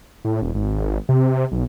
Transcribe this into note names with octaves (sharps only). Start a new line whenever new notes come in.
A2
E1
G#1
C3
B1